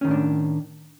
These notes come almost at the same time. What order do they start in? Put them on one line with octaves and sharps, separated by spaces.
C#4 D#3 A2 D4